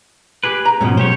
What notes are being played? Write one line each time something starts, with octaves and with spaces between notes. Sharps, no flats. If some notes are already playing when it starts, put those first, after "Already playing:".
G4 G#4 B4
A#5
G#2 B2 F3 C#4
B1 G4 C5 C#5